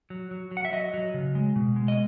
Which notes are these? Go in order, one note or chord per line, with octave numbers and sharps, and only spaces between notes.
F#3
F#3
F#3
F#5
E5
F#3 D#5
F#3
C#3
G#3
B2
G#3
D#5